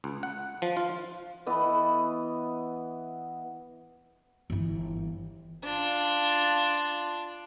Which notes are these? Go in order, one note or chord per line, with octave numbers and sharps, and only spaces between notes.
C#2
F#5
F3
F4
E3 B3 D#5
G1 E3
D4 F4